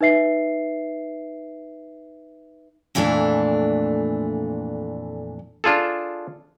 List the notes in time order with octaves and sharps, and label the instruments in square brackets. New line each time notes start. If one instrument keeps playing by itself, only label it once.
[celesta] D#4 B4 E5 C7
[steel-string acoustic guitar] F2 A#2 E3 A3 D4
[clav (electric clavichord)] D4 F4 G#4 A4